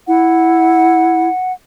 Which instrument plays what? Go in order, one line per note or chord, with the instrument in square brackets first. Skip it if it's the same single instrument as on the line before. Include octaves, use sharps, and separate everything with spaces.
[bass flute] E4 [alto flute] F#5